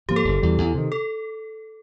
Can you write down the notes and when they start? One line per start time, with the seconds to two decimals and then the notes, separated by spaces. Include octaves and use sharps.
0.09 G#2 F3 A#3 G4
0.16 A4
0.24 F#1
0.41 E2 B2 G3
0.58 E2
0.74 C3 D#3
0.92 A4